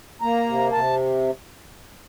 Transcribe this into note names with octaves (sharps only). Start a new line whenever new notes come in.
A#3 A#5
C3
C3 A5